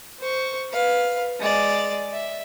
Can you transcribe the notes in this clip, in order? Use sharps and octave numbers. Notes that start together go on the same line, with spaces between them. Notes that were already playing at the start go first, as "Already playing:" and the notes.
C5 C#6
B4 F5
G#3 D5
E5